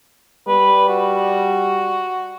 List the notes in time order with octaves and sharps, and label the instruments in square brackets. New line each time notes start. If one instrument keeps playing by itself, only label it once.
[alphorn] G3 [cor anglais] B4
[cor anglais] F#4